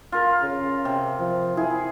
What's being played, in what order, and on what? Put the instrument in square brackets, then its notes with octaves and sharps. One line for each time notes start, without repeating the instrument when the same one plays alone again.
[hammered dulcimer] F4 A#4
[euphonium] C#3
[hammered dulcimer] C3
[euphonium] F3
[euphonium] E4 [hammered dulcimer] G#4